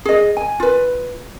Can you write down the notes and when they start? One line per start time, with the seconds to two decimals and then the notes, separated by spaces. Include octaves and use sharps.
0.05 G#4 D#5
0.37 G#5
0.60 F4 B4